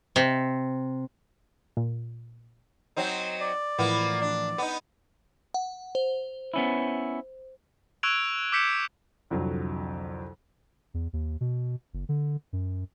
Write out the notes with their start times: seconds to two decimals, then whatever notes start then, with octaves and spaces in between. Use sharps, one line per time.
0.16 C3
1.77 A#2
2.97 F#3 C4 D#4
3.40 D5
3.78 A2 E3 F3 A#3 B3
4.22 D4
4.58 B3 D#4
5.54 F#5
5.95 C5
6.54 B3 C#4 E4
8.03 C#6 E6 F#6 G#6 D7 F7
8.52 D6 E6 G6 B6 C#7 E7
9.30 C2 F2 D3 F#3
10.94 E2
11.13 D#2
11.41 B2
11.94 F#1
12.09 D3
12.53 F#2